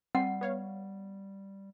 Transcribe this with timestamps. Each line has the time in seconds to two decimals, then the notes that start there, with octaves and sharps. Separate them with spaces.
0.15 G3 C4 F#5
0.41 B3 C#5 F5